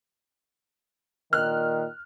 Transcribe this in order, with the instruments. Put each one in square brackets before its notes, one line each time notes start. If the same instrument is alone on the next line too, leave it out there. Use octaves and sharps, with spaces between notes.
[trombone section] A#2 D#3 [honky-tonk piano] F6 F#6